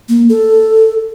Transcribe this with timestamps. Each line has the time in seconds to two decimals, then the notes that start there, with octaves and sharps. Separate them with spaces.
0.09 A#3
0.29 A4